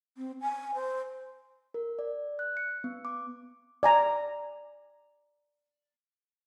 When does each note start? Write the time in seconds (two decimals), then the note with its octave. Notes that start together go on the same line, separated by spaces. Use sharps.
0.17 C4
0.41 G#5
0.74 C5
1.74 A#4
1.99 D5
2.39 F#6
2.57 C#7
2.84 B3
3.05 D6
3.83 D5 G#5 A#5